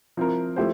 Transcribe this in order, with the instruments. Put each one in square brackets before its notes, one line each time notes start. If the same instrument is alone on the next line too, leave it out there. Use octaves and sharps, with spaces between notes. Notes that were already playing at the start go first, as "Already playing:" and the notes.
[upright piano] F3 C4 E4 A#4
F3 A3 E4 G4 C5